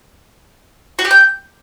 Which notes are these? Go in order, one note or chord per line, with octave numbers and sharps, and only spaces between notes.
F#4
G4
G5